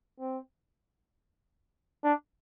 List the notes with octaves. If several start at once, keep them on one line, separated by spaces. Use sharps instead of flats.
C4
D4